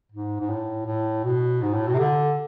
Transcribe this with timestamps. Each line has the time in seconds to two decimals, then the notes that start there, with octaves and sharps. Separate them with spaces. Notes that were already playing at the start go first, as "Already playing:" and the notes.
0.12 G#2
0.40 G#2
0.49 A2
0.86 A2
1.25 B2
1.62 G#2
1.74 A2
1.87 B2
1.94 C3
1.99 D3